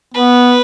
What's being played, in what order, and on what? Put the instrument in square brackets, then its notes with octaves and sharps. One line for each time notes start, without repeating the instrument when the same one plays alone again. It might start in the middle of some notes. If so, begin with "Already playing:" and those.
[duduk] B3 [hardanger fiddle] B4